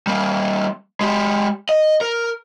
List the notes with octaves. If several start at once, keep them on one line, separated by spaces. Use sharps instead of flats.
G3 A#3
G#3 G4
D#5
A#4